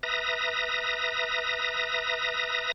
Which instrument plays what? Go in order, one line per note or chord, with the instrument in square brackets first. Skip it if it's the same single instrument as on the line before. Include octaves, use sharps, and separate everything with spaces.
[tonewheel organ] B4 E5 A#5 D#6 A#6